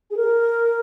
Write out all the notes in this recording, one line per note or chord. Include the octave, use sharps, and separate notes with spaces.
G#4
A#4